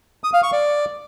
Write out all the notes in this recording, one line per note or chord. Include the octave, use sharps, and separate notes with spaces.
D#6
F5
C#6
D5